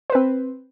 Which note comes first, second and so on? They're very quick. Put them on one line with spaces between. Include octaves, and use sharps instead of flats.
C5 B4 C4